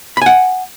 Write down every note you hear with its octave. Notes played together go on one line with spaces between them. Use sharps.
F#5 G#5 B5